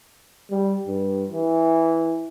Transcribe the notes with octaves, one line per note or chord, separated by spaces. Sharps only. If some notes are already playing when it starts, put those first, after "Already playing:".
G3
G2
E3